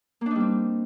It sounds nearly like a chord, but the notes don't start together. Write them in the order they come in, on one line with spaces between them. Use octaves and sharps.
A#3 D4 D#4 G3 C4